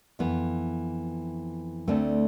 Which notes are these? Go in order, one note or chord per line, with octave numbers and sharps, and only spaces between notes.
F2 E3 B3
D2 D3 A3 C4